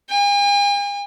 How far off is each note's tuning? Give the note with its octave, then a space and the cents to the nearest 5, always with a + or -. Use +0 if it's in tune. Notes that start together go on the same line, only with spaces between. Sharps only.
G#5 -45